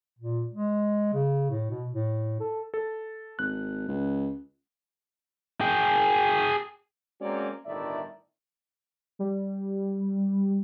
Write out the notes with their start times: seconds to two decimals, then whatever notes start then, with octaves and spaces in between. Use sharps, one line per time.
0.19 A#2
0.53 G#3
1.14 C#3
1.50 A2
1.70 B2
1.93 A2
2.40 A4
2.74 A4
3.39 G#1 F#6
3.88 C#2
5.61 G#4 G5
7.20 G#3 A#3 C4 C#4 F#4 D5
7.66 G1 A2 D#3 D5 E5
9.19 G3